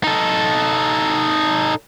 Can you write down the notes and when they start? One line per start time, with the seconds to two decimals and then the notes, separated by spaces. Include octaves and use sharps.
0.04 D#4 A4